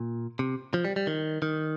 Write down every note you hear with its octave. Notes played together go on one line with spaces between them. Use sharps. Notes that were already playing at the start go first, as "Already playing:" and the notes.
Already playing: A#2
C3
F3
G3
G3
D#3
D#3